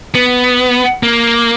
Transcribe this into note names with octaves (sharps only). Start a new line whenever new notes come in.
B3
A#3